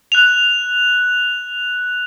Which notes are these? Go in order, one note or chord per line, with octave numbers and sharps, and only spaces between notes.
F#6 F7